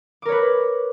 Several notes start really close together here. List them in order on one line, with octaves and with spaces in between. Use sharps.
D6 A#4 C#5 B4